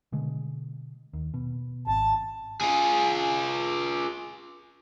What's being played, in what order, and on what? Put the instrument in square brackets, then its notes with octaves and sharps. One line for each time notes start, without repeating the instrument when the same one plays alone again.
[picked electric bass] B2 D3 G#3
D#2
B2
[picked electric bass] G#1 [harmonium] A5
[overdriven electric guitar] F4 G#4